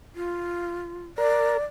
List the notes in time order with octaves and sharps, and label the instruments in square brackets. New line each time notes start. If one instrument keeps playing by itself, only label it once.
[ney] F4
[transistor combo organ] A#4 [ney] D5